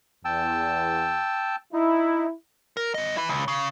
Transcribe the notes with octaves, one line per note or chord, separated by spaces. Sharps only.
E2 G5 A5 E6
D#4 E4
A#4
G2 D#5
E4 B4
C#2
C#3